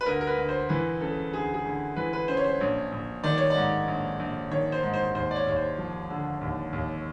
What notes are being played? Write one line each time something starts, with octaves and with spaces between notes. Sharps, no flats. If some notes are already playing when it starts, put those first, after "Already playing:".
B4
D2 A#4
A#4
B4
D2
C5
E3 B4
C#3 A4
D2 G#4
G#4
D2
E3 B4
B4
C#3 C5
C#5
C5
A#1 C#5
A#1
D#3 D5
C#5
D5
G#2
A#1
A#1
D#3 C#5
C5
G#2
C5
D#2 C5
D5
C#5
D#2 C#5
C5
F3
D3
D#2
D#2